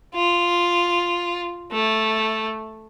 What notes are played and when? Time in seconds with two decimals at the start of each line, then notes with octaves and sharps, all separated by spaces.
0.14 F4
1.71 A3